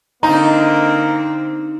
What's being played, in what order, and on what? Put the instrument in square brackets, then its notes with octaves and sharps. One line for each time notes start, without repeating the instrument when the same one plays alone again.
[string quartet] D3 C4 [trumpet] A#3 [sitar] D#4 [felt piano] A#5